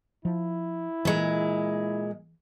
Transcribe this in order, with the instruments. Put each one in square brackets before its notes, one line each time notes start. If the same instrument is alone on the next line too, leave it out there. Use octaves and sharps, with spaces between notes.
[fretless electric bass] F3 [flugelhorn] E4
[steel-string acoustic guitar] A#2 G#3 [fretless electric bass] E3